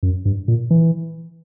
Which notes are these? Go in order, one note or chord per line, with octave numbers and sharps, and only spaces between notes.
F#2
G2
A#2
E3